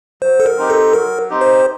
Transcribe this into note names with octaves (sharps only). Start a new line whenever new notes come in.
F#3 C5
A4
A#4
C4 D#4 G4
A4
F#3 A#4
C4 D#4 G4
C5